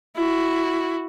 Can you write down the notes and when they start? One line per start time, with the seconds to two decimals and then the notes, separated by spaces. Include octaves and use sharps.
0.17 E4 F#4